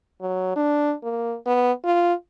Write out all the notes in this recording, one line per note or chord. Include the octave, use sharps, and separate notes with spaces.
F#3
D4
A#3
B3
F4